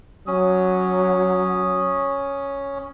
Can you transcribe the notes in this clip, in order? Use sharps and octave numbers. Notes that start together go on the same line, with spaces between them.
F#3 C#4 D#6